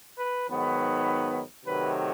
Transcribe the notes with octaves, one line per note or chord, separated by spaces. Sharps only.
B4
G#2 D#3 F#3 B3
C3 D#3 F#3 A3 B4